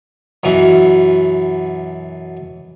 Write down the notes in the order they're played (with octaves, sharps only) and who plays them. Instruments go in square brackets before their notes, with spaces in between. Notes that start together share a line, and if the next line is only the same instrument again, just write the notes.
[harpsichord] F#2 B2 E3 F#4